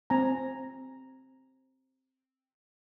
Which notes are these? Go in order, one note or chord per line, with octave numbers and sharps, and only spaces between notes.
C4 G#5 A#5